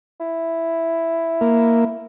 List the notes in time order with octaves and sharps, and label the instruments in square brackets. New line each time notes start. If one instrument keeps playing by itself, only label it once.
[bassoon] E4
[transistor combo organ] A#3